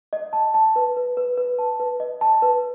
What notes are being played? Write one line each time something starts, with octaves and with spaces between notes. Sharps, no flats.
D#5
A5
A5
B4
B4
B4
B4
A5
B4
D#5
A5
B4